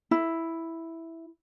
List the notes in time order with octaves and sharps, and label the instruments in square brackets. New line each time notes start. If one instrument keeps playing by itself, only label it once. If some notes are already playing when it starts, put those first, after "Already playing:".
[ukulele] E4